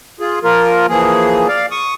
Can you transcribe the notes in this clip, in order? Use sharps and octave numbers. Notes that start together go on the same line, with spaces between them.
F4 G#4
F3 A#3 F4 A#4
E3 F3 A#3 G#4
D5 F5
C#6 D#6